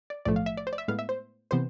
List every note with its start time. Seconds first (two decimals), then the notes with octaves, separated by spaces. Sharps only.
0.10 D5
0.25 B1 A2 F3 A3 D5
0.36 F5
0.46 E5
0.57 D5
0.67 C5
0.73 D5
0.78 E5
0.88 A2 G#3 B3 F5
0.99 E5
1.09 C5
1.51 C3 E3 B3 C5